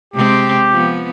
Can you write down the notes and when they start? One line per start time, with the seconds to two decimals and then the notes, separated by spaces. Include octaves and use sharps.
0.14 C3 G#3 C4 G4
0.71 F3 B3